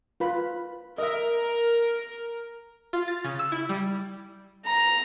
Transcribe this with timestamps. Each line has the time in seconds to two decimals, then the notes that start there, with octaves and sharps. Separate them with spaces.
0.20 F4 B4 B5
0.98 A#4 D#5 E5
2.93 F4
3.08 A6
3.24 C#3
3.39 E6
3.52 E4
3.69 G3
4.67 A#5